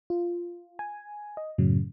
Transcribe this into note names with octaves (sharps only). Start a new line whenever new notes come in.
F4
G#5
D#5
F#2 A2 C#3 F#3